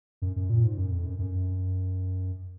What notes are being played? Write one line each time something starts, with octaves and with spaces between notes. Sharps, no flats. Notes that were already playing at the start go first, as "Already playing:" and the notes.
F#2
F#2
A#2
G#2
F#2
F2
F#2
F#2